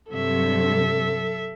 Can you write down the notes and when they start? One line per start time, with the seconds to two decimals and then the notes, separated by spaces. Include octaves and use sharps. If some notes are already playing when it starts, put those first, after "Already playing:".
0.10 G2 C3 F#3 A4 E5